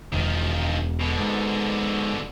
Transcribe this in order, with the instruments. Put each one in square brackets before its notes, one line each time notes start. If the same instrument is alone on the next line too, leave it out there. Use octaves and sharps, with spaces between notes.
[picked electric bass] E1 [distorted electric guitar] D#3 F3
[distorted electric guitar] B2 D3
[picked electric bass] G#2